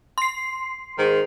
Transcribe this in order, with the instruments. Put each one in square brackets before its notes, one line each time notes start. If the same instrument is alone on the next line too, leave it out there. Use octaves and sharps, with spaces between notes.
[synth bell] C6 C7
[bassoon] G#2 [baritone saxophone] D#3